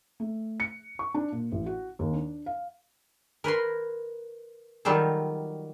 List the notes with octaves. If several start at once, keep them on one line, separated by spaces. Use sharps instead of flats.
A3
C#7
C#6
D4
A#2
A1
F#4
D#2
D4
F5
A#4 B4 C#5 C6
D#3 F#3 G3 F4 A4